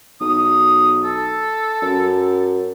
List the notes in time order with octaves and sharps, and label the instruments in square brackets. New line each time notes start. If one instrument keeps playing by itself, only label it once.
[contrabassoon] B1 [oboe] D#6
[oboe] A4
[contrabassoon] F#2